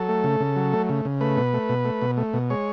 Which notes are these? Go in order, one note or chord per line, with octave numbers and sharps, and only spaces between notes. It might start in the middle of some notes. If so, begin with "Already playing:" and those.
Already playing: F#3 A4
A3
C#3
C#3
F#3
A3
C#3
C#3
A3 B4
B2
A3
B2
A3
B2
A3
B2
G#3 C#5